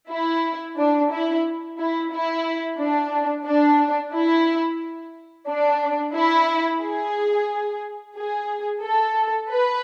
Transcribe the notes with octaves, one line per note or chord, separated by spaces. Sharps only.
E4
D4
E4
E4
E4
D4
D4
E4
D4
E4
G#4
G#4
A4
B4